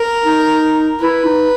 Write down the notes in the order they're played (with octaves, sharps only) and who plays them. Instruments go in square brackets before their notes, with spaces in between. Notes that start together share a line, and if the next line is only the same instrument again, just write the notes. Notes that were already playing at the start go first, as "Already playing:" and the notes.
Already playing: [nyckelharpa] A#4
[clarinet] D#4
[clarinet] E4 [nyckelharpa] B4
[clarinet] D#4